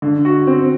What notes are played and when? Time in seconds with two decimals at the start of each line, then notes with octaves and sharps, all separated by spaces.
0.02 D3
0.25 F#4
0.47 C4